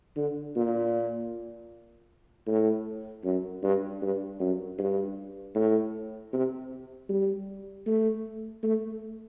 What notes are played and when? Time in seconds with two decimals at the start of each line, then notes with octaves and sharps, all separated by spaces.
0.17 D3
0.56 A#2
2.47 A2
3.24 F#2
3.63 G2
4.02 G2
4.40 F#2
4.78 G2
5.55 A2
6.33 C3
7.09 G3
7.86 A3
8.63 A3